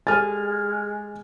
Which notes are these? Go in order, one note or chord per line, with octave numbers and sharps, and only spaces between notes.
G#3 G4 A4 G#5 F6 A6